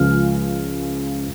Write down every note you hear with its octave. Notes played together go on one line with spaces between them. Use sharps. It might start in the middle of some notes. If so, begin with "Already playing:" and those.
Already playing: C#2 C#3 F3 F6